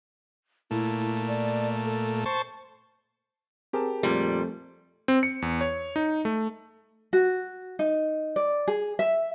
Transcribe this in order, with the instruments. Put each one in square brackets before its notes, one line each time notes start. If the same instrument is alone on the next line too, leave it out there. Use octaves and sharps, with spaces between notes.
[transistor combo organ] A#2 A3 [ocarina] E4
[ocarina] D5
A4
[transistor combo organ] C5 A5 C#6
[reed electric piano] C4 G#4 A#4 [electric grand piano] G4 A5
[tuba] F2 [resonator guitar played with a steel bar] A#2 G3 [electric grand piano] A3
[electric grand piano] C4
C#7
E2
C#5
D#4
A3
[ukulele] F#4
D#4
D5
G#4
E5